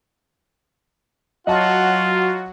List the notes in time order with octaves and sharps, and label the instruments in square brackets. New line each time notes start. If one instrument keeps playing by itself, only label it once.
[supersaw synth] F#3 F#4 [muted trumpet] F4 [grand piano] D#5 A5 [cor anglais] F#5